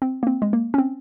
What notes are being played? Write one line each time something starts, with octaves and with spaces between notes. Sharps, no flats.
C4
A#3
C4
G#3
A#3
C#4
C4